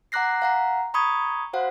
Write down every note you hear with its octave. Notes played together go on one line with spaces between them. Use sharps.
F#5 A#5 D6 F#6 A#6 C7
F5 F#5 A#5
A#5 B5 C#6 D#6 G#6
F#4 C5 F5 F#5